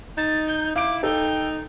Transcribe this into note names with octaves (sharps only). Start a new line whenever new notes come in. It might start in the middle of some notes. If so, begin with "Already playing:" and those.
D#4 A6
G6
E4 F5 D6 D7
D#4 A4 G5